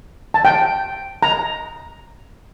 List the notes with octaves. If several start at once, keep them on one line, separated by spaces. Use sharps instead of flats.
A5
G5
A#5